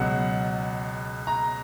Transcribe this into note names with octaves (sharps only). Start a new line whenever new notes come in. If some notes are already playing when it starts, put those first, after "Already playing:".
Already playing: C#2 B2 F#3 F#5
A#5